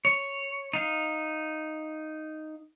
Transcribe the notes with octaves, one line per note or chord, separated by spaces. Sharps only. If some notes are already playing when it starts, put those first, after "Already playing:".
C#5
D#4 F5